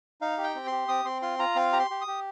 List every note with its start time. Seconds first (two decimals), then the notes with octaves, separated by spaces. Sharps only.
0.21 D#4 F5
0.38 G4
0.43 G5
0.55 C4
0.67 G4 C6
0.88 C4 D#6
1.05 C4 C6
1.22 F4 C6
1.39 F4 A#5
1.55 C4 F5
1.73 G4 A#5
1.79 C6
1.90 G4
2.01 D#6
2.07 G4